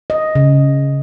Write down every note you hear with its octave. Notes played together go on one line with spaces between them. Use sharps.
D#5
C#3